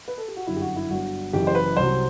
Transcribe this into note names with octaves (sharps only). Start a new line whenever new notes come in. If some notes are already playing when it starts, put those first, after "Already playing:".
B4
A4
G4
F#4
G1 F#2 D3 F#3 E4
G4
F#4
E4
G1 G2 F#3 F#4
F#1 F#2 E3 G4
C5
B4
C2 C3 F#3 C5